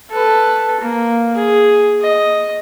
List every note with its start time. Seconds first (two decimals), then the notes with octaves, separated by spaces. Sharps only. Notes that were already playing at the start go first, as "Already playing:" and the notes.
0.11 A4 B4
0.81 A#3
1.35 G#4
2.01 D#5